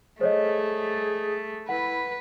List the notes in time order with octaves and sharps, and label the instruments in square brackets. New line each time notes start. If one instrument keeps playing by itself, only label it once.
[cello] A3 [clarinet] G#4 [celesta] C5 C#5 D#5
[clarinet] E4 [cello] B4 [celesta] F#5